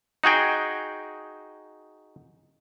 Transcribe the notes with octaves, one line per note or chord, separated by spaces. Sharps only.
D#4 F#4 G#4 G5